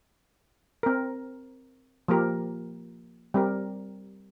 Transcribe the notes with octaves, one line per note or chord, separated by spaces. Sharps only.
C4 A#4
F3 A#3 G4 A#4
G3 C4 G4 A#4